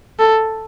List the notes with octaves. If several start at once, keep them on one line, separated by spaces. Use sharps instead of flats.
A4